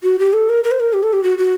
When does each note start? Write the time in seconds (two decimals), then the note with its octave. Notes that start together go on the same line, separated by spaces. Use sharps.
0.03 F#4
0.19 G4
0.33 A4
0.49 A#4
0.64 A#4
0.71 C5
0.80 A#4
0.93 G4
1.03 A4
1.13 G4
1.23 F#4
1.38 F#4